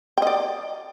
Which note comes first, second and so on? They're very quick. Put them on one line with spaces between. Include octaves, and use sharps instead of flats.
G5 D#5 D5